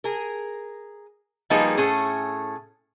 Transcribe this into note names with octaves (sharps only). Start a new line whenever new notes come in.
G#4 A#4
F3 G3 A#3 D#4 G#4 B4
A2 A3 C#4 G#4